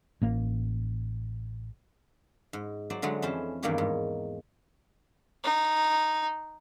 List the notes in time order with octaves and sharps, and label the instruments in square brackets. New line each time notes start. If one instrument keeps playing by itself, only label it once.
[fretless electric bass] A1 A#3
[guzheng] G#2
F#3 C5 D5
D3 F#3 G#3 A3
F2 E3 C#4 C5 A5
E2 G2 D#3 A#3 G4 C#5
G#2
[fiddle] D#4